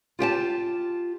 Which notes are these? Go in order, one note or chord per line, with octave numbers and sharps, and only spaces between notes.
F4 G4 G5 A5